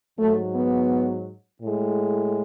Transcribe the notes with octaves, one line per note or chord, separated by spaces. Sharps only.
G#2 F#3 A3
B3
A2 G#3